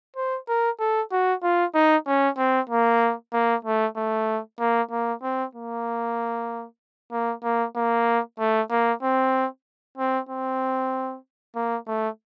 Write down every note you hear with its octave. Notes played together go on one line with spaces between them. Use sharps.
C5
A#4
A4
F#4
F4
D#4
C#4
C4
A#3
A#3
A3
A3
A#3
A#3
C4
A#3
A#3
A#3
A#3
A3
A#3
C4
C4
C4
A#3
A3